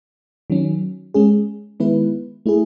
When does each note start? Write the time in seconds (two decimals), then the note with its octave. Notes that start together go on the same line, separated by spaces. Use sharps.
0.50 D#3 F#3 C#4
1.14 G#3 C#4 G#4
1.80 D#3 G#3 B3 E4 B4
2.46 A3 E4 G#4